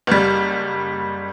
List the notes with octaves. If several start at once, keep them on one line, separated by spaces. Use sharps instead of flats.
F#1 G3